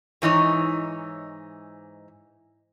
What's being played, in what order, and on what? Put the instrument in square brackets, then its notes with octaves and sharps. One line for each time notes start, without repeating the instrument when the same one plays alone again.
[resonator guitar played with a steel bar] G#2 E3 D#4 C#5